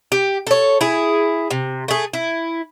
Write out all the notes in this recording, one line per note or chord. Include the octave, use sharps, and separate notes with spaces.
G4
A4 C#5
E4 G#4
C3
A3 G#4
E4